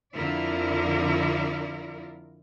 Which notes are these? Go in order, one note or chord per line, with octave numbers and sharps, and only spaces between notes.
F2 D3 E4 F4 A#4 D5